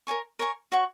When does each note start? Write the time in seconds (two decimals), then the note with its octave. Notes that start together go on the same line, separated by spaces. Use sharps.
0.07 A#4 C#5 G#5 C#6
0.39 A#4 C#5 G#5 C#6
0.72 F#4 C#5 F#5 C#6